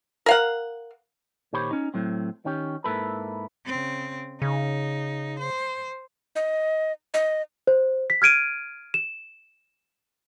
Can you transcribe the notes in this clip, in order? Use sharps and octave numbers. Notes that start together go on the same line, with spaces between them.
A#4 F5 F#5
A#2 D#3 G4 C5 C#5 B5
C#4 D#4
A2 F#3 C4
D#3 C#4 G4
G#2 A#3 E4 A4 B4
C#3 C4
C#3 D#4
C5
D#5
D#5
C5
B6
F6 G#6 D7 D#7
E7